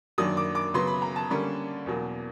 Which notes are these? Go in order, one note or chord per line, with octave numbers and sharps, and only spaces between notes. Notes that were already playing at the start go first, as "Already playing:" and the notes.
F#2 D#3 F#3 A#3 D4 D#6
D6
D6
C#3 F#3 B3 C6
B5
A#5
A5
D3 G3 A#3 C#4
E2 B2 F#3 A#3